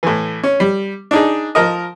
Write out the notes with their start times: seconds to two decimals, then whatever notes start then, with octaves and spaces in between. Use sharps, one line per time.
0.03 A2 E3
0.43 C#4
0.60 G3
1.11 D4 D#4 G#4
1.55 F3 A#4 D#5